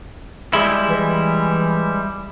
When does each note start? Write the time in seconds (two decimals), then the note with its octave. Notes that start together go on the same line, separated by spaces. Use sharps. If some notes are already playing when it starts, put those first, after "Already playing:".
0.53 G3 G#3 E4
0.87 E3